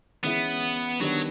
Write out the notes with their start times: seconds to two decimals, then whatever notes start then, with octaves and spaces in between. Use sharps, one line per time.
0.24 E3 G#3 B3 C#4 E4
1.01 D#3 F#3 G3 B3 D4